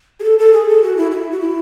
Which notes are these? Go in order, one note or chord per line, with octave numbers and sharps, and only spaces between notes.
G#4
A4
A4
G#4
A4
F#4
E4
E4
F#4
E4